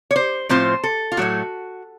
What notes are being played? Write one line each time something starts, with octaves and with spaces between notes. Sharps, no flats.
C#5
C5
A2 F3 C4 F4 C5
A4
F4
A2 F#3 A3 F#4